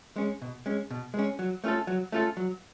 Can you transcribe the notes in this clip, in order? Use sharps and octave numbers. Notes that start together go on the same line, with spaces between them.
G#3 C#4
B2
G#3 C#4
B2
G#3 C#4
F#3
A3 C#4 F4 A4
F#3
A3 C#4 F4 A4
F#3